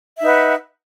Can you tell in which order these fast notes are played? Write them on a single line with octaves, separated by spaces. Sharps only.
E5 D#4 B4 F#5